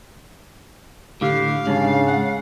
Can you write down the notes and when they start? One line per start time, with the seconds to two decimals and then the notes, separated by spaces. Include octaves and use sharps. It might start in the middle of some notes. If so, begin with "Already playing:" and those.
1.21 A2 D3 G4 F5
1.67 G#2 C#3 D4
2.07 F#5